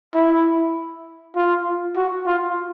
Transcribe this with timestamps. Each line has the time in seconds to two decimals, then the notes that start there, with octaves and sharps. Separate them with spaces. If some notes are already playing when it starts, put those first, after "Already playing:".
0.15 E4
1.36 F4
1.96 F#4
2.27 F4